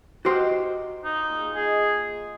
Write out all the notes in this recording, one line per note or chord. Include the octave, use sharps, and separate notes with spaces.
D#4 F#4 G4 C5
D#4 F4
A#2 G#4
D#4 G#4